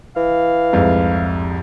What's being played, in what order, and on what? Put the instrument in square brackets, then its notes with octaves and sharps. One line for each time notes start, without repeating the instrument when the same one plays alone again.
[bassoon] E3 [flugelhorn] F5
[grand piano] C2 F2 G#2